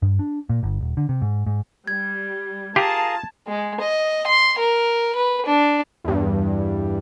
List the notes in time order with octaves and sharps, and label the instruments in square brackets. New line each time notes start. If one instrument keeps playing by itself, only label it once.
[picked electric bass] G2
D4
A#2
G1
D#1
D3
C3
G#2
G#2
[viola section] G3 [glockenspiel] G#6
[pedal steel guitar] F4 G#4 A#4 [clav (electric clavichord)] G4 [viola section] A5
[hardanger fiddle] G#3
D#5
C6
A#4
B4
D4
[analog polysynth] E2 G2